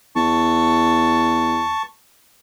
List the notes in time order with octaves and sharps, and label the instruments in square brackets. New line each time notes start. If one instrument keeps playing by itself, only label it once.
[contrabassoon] E2 [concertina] A5 C#6